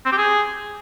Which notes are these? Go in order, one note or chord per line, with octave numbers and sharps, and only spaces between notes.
C4
G4
G#4